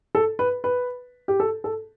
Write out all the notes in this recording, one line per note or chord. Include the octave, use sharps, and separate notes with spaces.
A4
B4
B4
G4
A4
A4